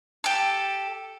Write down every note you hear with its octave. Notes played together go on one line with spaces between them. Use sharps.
G4 A4